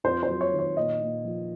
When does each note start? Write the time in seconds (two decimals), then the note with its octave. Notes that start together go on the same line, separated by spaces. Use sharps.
0.04 F2 C5
0.23 C5
0.29 F#3
0.41 C#5
0.53 D#3
0.59 C#5
0.77 A#2 D#5
1.01 A#2
1.25 F3